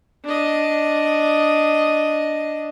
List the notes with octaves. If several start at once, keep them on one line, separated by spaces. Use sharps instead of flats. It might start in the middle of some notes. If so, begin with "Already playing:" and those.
D4 D#5